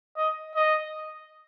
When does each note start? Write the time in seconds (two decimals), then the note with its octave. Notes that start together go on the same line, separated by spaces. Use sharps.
0.16 D#5
0.55 D#5